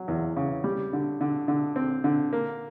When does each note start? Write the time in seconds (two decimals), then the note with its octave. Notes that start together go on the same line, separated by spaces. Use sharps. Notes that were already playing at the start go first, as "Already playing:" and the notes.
Already playing: F#3
0.08 E2
0.37 C#3
0.64 G3
0.93 D3
1.21 D3
1.48 D3
1.76 C4
2.04 D3
2.33 A#3